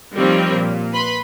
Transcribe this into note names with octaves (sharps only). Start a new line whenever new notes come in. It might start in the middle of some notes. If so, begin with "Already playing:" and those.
D#3 F3 G3 A#3 C4 C#5
A#2
B4 B5 C6